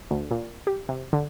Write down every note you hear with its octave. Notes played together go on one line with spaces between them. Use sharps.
D2
A#2
G4
C3
D3